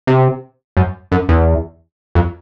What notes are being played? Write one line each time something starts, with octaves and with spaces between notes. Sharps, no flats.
C3
F#2
F#2
E2
F2